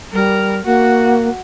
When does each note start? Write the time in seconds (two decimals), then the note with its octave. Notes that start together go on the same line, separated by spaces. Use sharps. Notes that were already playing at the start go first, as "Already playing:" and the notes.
0.13 G3 A#4
0.65 A#3 F#4